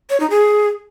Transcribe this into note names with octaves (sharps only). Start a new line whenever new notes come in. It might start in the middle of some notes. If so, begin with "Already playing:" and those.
C#5
D#4
G#4